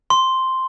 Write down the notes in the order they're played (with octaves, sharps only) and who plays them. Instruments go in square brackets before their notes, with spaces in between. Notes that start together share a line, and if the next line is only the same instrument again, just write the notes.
[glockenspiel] C6